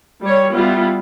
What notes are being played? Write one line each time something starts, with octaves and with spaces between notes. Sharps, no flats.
G3 C#5
G3 B3 E4 F4